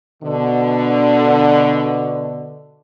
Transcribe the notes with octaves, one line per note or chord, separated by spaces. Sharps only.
B2 D3